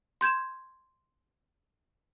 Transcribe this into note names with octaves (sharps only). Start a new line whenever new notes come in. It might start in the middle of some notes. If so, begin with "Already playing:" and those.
C6 G6 G#6 E7